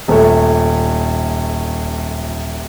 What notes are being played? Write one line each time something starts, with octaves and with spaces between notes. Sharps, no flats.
D#1 A3